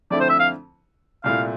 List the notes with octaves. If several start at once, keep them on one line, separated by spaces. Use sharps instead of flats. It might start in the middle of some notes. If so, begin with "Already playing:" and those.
F2 D3 A3 C4 E4 D5
C5
E5
F5
C2 A#2 A3 E4 F5